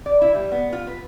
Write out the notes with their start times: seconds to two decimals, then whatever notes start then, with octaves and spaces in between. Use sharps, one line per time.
0.06 D5
0.22 E4
0.35 G3
0.52 B3
0.73 F4
0.87 B4